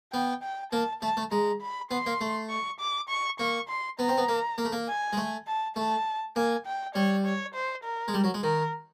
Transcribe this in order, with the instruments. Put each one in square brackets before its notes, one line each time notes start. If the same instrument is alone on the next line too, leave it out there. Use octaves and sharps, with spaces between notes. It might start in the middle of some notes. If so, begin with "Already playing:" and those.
[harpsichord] B3 [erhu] G5
[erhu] G5
[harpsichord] A#3 [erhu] A5
[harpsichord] A3 [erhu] A5
[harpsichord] A3
[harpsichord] G#3 [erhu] A#5
[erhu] B5
[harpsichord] B3 [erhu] C6
[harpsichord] A#3
A3
[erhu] C#6
D6
C#6
[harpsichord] A#3 [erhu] C#6
[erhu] C6
[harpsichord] B3 [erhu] A#5
[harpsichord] C4
B3
A#3
A#3
A3
A#3
[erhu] G#5
[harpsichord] G#3
A3
[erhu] A5
[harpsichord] A3 [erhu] A5
[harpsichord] A#3 [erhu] G#5
[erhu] G5
[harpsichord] G3 [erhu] C#5
[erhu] C#5
C5
A#4
[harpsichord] G#3
G3
F#3
G#3
[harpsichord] D#3 [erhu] A#4